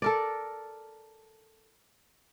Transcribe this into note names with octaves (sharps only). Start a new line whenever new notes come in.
A4 A#4 D5